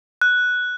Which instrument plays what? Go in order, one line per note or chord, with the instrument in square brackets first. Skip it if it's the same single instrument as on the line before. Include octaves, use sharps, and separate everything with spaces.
[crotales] F#6